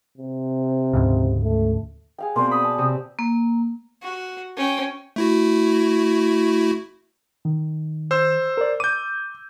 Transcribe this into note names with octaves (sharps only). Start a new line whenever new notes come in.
C3
D2 G#2 C#3
A3
G#4 F5 G5
B2 A#3 C4 D5 C6
B5 D#6
A5
C3
A#3
F#4
C#4 G5
A3 E4 F#4
D#3
C5 E6
A#4 D5
D6 G6 D#7